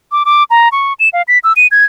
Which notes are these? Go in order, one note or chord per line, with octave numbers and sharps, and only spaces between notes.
D6
D6
A#5
C#6
E7
F5
B6
E6
D#7
G#6